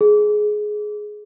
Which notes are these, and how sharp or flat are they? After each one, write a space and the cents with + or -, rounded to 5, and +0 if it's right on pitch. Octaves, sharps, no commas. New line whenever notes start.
G#4 +15